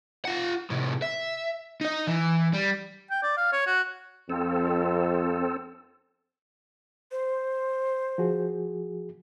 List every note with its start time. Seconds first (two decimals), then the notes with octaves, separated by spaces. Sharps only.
0.25 F4 F#5
0.70 A2 C3
1.02 E5
1.81 D#4 D#5
2.07 E3
2.53 G3
3.11 G5
3.23 D5
3.37 F5
3.52 C#5
3.67 F#4
4.30 F2 C4 A4
7.11 C5
8.18 F3 F#4 G#4